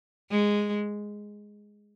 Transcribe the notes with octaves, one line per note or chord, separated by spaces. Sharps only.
G#3